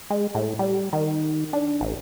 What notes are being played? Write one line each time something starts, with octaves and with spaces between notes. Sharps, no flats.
G#3
A2
G3
D#3
D4
A1